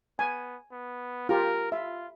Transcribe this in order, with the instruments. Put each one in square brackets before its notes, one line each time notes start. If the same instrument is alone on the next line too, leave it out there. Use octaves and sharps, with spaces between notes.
[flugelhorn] B3 [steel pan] G#5
[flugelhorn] B3
[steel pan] F4 G4 [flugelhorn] A#4
[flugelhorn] F4 [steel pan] E5